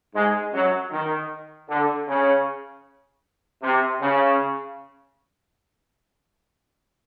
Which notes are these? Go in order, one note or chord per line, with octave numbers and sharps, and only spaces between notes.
G#2 G#3
F#2 F#3
D#3
D3
C#3
C3
C#3